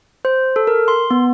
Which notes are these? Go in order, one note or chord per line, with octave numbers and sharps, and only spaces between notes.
C5
A4
A#4
C6
B3